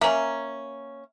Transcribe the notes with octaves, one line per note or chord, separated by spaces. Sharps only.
A#3 C#4 E5 A#5